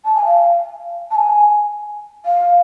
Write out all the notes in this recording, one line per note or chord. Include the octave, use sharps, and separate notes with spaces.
A5
G#5
F5
A5
G#5
F5